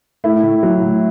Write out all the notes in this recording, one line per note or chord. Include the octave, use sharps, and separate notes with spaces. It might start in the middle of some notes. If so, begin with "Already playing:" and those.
A3 E4
A2
F#3
A2